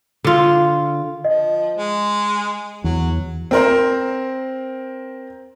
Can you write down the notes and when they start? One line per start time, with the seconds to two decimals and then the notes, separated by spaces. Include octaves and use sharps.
0.24 D3 F4
1.24 F3 D#5
1.76 G#3
2.84 E2 F#3
3.51 C4 A#4 C5